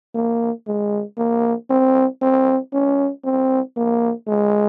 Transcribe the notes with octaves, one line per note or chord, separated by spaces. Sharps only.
A#3
G#3
A#3
C4
C4
C#4
C4
A#3
G#3